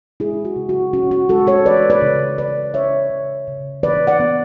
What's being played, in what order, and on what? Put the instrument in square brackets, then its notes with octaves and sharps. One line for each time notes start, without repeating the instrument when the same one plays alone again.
[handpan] G#3 E4 G#4
F#4
C#3
F#4
C#4 F#4
F#4
G#3 F#4 A4
A4 C#5
E3 B4 D5
B4 D5
C#3
E3 B4 D5
C#3 C#5 E5
C#3
C#3
E3 B4 D5
D5 F#5
B3